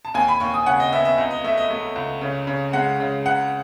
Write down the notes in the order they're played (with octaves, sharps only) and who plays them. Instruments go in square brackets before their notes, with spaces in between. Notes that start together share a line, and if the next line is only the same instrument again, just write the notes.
[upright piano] A5
D#2 G#5
B5
D#2 C#6
D#6
C#3 F#5
D#5
B3 E5
E5
C#2 D#5
D#5
A3 E5
D#5
A3
C#2
C#3
C#3
G#3 F#5
C#3
C#2 F#5